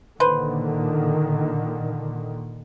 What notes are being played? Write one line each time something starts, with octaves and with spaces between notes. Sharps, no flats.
A#2 D3 D#3 B4 C5